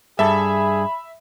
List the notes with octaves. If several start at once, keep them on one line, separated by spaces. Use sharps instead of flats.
G2 G#4 A4 E5 B5